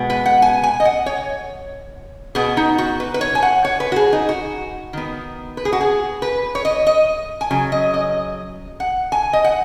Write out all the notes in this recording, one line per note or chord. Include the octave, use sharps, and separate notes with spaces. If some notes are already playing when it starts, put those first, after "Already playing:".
Already playing: B2 G#3 B3
B4
F#5
G#5
G#5
D#5
F#5
C#5
B2 B3 G#4
D#4
F#4
B4
B4
C#5
G#5
F#5
C#5
B4
F#4
G#4
D#4
F#4
D#3 B3
B4
G#4
F#4
G#4
B4
C#5
D#5
D#5
G#5
C#3 F#3
D#5
D#5
F#5
G#5
D#5
F#5